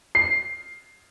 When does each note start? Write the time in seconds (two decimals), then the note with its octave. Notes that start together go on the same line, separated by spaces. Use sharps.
0.15 C7